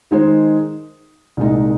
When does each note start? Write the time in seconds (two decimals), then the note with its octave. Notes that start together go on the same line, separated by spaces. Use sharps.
0.11 D#3 G#3 D#4 G#4 C5
1.37 C2 A#2 G#3 D#4